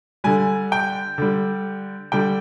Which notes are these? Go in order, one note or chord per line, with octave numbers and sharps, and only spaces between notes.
D3 G3 G#5
G5
D3 G3
D3 G3 G5